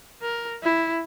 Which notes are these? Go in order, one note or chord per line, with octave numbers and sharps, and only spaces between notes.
A#4
E4